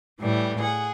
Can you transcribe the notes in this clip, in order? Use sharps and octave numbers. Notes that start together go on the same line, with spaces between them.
A2 E3 G3
G#4 F#5